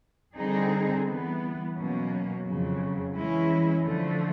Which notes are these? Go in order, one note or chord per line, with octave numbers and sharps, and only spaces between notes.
D3 G3 C4 D#4 G#4
E3 G3 B3
B2 F#3 A#3 C#4
F2 C#3 F#3
E3 G#3 C#4 E4
D3 F3 A3